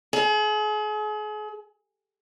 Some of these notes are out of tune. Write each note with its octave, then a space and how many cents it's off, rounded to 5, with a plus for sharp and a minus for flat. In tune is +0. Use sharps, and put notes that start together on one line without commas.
G#4 +40